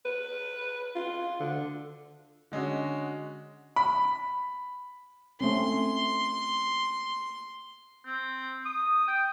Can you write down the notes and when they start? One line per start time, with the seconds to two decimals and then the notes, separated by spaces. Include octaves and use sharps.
0.06 B4
0.96 F4
1.40 D3
2.52 D3 G#3 C#4 F#4
3.76 B5
5.41 A3 C4 C#4 C6
8.05 C4
8.65 D#6
9.08 G5